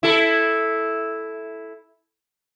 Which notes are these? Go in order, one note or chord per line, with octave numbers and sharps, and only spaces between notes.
E4 A4